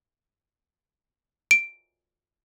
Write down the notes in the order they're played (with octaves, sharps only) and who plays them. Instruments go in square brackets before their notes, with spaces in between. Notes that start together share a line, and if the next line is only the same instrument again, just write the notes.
[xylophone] D7